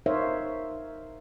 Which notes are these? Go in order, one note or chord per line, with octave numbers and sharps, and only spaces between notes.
D#4 A#4 C5 C#5 E5 F5